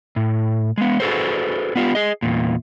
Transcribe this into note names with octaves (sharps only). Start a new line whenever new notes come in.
A2
G#3 B3
F#4 G#4 A4 B4 C5
B3 F4 G4
G#4 D#5
E2 A#2